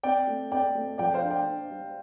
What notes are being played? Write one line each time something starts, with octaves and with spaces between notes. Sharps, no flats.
C4 D5 G5
A3
C4 D5 G5
A3
F3 D5 G5
C5 F5
D4
D5 G5
D4
G3